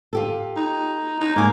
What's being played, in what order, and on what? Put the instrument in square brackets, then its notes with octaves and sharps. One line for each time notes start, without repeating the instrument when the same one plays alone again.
[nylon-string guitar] F4 G4 A4
[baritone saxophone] D#4
D#4
[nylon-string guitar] G#2 G#5 [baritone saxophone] A#3